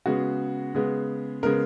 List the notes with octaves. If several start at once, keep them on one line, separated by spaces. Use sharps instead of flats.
C#3 G#3 B3 F#4
C#3 G#3 B3
C#3 G#3 B3 A#4